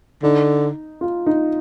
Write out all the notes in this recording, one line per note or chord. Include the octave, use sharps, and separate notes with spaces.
D3 D#4
F4
D#4